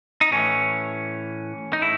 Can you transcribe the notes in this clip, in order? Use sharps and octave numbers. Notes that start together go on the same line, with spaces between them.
D#4
A2 E3 C#4
D#4
A2 E4